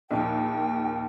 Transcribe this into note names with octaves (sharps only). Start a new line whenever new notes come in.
A#1 D#2 G5